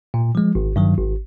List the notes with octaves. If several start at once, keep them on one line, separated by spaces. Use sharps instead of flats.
A#2
F3 G#3
G#1
G2 D#3 F#3
G#1